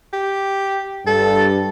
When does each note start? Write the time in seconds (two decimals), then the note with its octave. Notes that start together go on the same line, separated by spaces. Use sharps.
0.13 G4
1.07 G2 A4